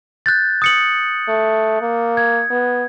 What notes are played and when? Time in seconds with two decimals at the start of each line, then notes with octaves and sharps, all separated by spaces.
0.26 F#6 G6 A6
0.62 D#6 C#7 F#7
1.28 A3
1.81 A#3
2.17 G#6
2.50 B3